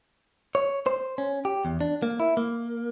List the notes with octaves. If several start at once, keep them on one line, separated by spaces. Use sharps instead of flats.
C#5
C5
C#4
G4
E2
D4
A#3
E4
A#3